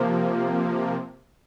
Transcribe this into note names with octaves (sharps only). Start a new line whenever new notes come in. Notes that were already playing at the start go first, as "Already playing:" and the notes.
Already playing: C3 F3 A#3